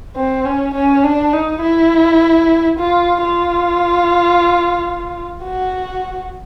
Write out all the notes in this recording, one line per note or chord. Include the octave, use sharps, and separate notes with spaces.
C4
C#4
C#4
D4
D#4
E4
F4
F4
F#4